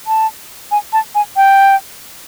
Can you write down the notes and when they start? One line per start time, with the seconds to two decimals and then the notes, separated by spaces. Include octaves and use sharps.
0.07 A5
0.71 G#5
0.93 A5
1.15 G#5
1.36 G5